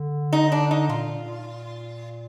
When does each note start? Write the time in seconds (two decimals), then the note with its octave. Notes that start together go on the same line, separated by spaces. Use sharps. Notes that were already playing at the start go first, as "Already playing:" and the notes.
Already playing: D3
0.33 D#4
0.52 D4
0.71 D#4
0.89 A#2 F4